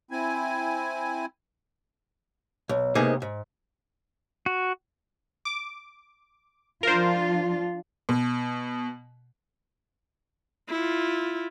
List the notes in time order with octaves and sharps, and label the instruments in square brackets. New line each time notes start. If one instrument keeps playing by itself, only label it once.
[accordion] C4 E4 G#5
[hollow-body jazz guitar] B1
G#2 C3 A#3 B3 D#4 G#4
G#2
[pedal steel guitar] F#4
[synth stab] D6
[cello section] F3 D4 F4 [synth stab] A#4 C5
[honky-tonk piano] B2
[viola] E4 F4